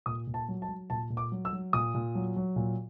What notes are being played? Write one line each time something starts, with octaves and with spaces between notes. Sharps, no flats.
A#2 D#6
A#2
A5
F#3
A5
F#3
A#2 A5
A#2
D6
F#3
E6
F#3
A#2 D#6
A#2
F#3
F#3
A#2